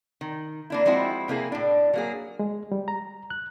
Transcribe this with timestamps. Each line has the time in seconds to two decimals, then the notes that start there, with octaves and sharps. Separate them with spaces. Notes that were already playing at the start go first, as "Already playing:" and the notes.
0.21 D#3
0.70 A#3 D4 E4
0.85 F3 G#3 C4 E4 F#4
1.28 C3 A#3 E4 G#4
1.52 A2 D4
1.93 F#3 A#3 G#4
2.39 G#3
2.72 G3
2.88 A#5
3.30 F#6